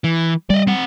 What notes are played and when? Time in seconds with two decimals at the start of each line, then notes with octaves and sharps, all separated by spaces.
0.04 E3
0.50 G3 D5 D#5
0.67 C4 F#5